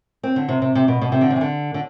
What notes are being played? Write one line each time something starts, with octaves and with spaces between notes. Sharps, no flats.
C4
D3
C3
C3
C3
B2
B2
C3
D3
C3
E3
D3
D3